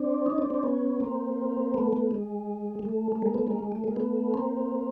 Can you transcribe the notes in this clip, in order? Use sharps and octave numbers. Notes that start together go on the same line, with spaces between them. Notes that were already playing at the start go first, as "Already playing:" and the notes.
Already playing: C4 D4
C#4 D#4
C4 D4
C4 D4
B3 C#4
A#3 C4
A3 B3
A3 B3
G#3
G#3
A3
A3
G#3 A#3
A3 B3
G#3 A#3
G#3
A3
G#3 A#3
A3 B3
A#3 C4